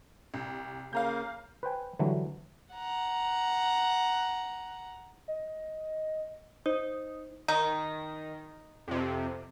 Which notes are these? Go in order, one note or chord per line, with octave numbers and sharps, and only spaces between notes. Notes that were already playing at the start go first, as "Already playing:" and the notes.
C2
C#3 A#3 F5 A#5 G6
B4 C5 G5 G#5
D3 E3 F#3 G3 A3
F#5 A#5
D#5
D#4 C5
D#3 D#4
F2 C3